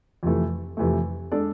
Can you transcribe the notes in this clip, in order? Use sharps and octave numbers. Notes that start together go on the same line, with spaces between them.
F2 C3 E3 A3
F2 C3 E3 A3
G#3 D4 A4 D5